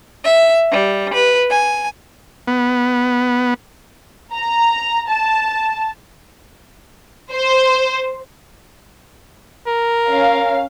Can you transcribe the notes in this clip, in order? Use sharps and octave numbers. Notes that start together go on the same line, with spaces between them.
E5
G3
B4
G#5
B3
A#5
A5
C5
A#4
C#4 F5